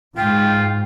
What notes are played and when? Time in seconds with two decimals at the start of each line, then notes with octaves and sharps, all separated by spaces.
0.16 G#2 F4 G5